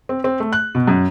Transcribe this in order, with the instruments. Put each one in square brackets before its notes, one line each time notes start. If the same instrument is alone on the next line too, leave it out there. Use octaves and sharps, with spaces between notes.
[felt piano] C4
C4
A3
F#6
B2
F#2